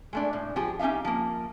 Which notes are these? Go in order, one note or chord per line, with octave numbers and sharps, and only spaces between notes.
G#3 A3 D4
A2
F3 G4 G#4
C#4 D#4 G4 E5 F5
F3 A#3